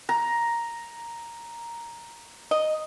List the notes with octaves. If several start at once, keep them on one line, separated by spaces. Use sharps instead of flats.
A#5
D#5